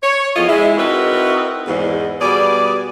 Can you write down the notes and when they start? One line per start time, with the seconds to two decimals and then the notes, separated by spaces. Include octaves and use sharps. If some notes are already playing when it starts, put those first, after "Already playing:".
0.02 C#5
0.35 E2 F3 F4 A4 D#5
0.48 G#3 E4
0.77 C4 D#4 E4 F#4 A#4 B4
1.67 E2 G#2
2.21 B2 G3 G#4 D5